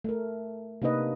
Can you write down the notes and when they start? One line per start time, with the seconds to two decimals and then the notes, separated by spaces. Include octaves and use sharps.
0.04 A3 A#4
0.82 C3 A#3 D4 D#4 B4 D#5